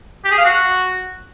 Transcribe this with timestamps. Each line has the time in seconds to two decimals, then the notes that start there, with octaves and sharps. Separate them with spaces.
0.24 G4
0.31 G#4
0.38 F5
0.45 F#4